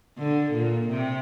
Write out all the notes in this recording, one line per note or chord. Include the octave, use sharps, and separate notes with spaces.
D3
A#2
C3